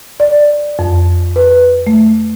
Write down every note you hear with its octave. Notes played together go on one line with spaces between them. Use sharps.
D5
F2
B4
A3